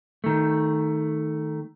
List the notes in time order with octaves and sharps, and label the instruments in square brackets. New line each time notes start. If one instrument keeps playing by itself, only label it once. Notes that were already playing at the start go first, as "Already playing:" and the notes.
[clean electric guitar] D#3 A3